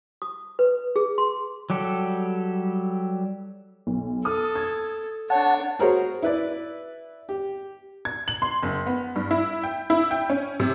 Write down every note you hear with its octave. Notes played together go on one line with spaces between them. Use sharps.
D#6
B4
G#4
C6
F#3 G3 G4 A4
B1
A4 D#6 F6
G#6
D4 C#5 F#5 A5
F#4 G#4 A#4 C5 C#5
E4 B4 D5
G4
G#6
F#7
C6
F#1
B3
G2
E4
G5
E4
G5
C#4
C3